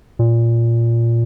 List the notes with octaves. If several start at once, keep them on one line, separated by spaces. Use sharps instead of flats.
A#2